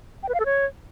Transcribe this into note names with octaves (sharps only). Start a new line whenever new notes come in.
G5
B4
F5
A4
C#5